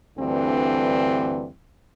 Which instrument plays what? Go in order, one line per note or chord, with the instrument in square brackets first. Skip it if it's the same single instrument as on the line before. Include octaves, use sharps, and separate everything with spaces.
[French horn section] D2 G2 D3 E3 C4